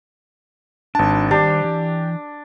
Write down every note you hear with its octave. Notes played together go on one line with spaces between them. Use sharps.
G#1 D4 A5
D#3 G3 D4 G4 C5
E3